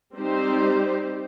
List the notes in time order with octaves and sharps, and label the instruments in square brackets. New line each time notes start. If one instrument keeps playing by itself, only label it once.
[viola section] G3 C4 D#4 G4 C5